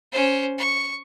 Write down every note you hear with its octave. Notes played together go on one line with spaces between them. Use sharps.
C#4 C5
C#6